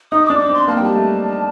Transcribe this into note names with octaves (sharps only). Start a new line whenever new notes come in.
D#4 D#6
D4 D6
D6
C4
C6
A#3 A5
G5
G3
A5
A3